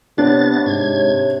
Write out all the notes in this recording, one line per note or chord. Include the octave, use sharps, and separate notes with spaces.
C3 B3 D4 C#5 A6
G#2 C3 G#6